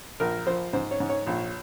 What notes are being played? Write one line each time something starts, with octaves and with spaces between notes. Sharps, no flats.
A#1 A#4
F3 C5
G#2 C5
C#5
G#2
C#5
A#1